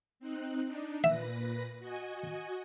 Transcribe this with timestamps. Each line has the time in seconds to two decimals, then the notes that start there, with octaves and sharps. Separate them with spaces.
0.20 C4 D#4 F#6
0.67 D4 D#4
1.04 A#2 B4 E5 A#6
1.79 F#4 D#5 G#5